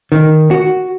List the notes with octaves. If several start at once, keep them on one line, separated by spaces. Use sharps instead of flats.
D#3
F#4